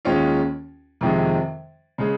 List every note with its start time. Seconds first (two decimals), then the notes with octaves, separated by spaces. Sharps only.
0.05 D#2 D#3 G#3 C#4 F4
1.01 F2 C3 D#3 G#3
1.98 C#3 G#3